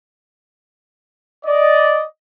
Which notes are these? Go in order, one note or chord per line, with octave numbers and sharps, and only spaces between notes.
D5 D#5